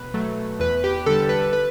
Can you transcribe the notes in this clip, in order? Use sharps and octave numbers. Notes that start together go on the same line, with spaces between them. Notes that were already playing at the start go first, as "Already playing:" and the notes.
Already playing: B2 B4
F#3 A3
E2 B4
G4
D3 G3 A4
B4
B4